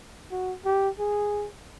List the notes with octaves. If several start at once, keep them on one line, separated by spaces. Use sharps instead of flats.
F#4
G4
G#4